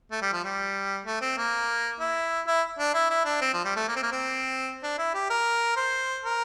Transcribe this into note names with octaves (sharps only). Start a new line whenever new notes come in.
A3
G3
F3
G3
A3
C4
A#3
E4
E4
D4
E4
E4
D4
C4
F3
G3
A3
A#3
C4
A#3
C4
D4
E4
G4
A#4
C5
A#4